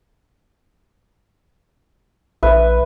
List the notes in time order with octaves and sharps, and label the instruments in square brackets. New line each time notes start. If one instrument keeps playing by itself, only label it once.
[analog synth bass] A#1 [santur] B4 E5